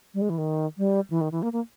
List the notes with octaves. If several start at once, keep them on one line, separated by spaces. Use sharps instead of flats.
G3
G#3
E3
D#3
G3
E3
D#3
E3
A#3
A#3